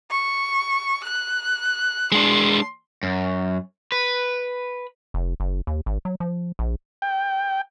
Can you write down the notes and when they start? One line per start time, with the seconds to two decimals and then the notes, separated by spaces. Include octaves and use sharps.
0.11 C#6
1.04 F#6
2.12 G#3 D4 C6
3.03 F#2
3.92 B4
5.14 F1
5.40 F#1
5.67 D#2
5.86 G#1
6.05 F#3
6.20 F3
6.59 A#1
7.02 G5